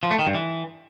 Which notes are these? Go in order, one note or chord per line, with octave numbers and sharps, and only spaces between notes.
F3
A3
D#3
G2
E3